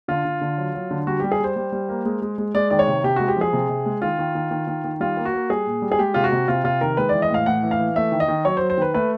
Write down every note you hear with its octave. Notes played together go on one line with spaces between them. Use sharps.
D3 F4
D3
D3
F#3
F#3
D3
G3 F#4
G3 G4
G#4
G3 C5
G3
G3
A#3
G#3
G#3
G#3
G#3 D5
D#3 D5
C#5
C3
C3 G4
G#3 F#4
G4
F3 G#4
C3
C3
G#3
D#3 F4
D#3
D#3
D#3
D#3
D#3
G3 F4
A#3
F#4
A#3
G3 G#4
A#2
G3
G#4
G#3 G4
C3 F4
F#4
C3
C3 F4
C3 F4
D#3 A#4
G#3 B4
E3 D5
D#5
A2 F5
A2 F#5
E3
F5
E3
A3 E5
D#3
D#5
D#3
F#3 C#5
C5
F#3
C5
D#3 B4
A3 B4